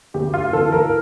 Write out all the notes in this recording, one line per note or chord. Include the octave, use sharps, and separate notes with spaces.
D2 G4
F4
E3 A4
A#4